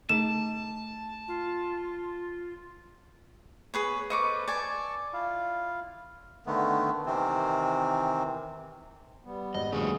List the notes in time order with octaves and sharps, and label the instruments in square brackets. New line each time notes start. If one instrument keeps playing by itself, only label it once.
[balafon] A3 D#4 G#4 [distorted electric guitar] A5 [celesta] E7
[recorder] F4
[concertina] B3 [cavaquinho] G#4 B4 C#5
[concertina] A4 B4 C5 [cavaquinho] D#5 C#6 D6
[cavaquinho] D5 G#5 [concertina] A5 C#6
[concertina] E4 F4 F5
[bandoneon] D3 D#3 A3 B3
C3 D#3 E3 C4
[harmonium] G3 B3
[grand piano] G#1 [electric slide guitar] D#5
[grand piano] D#1 D2 [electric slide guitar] F3 A3 C#4 [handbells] G#4